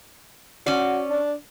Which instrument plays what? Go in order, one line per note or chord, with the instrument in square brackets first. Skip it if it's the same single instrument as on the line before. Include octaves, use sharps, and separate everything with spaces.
[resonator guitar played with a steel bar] C#4 D5 [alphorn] F#4
[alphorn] D4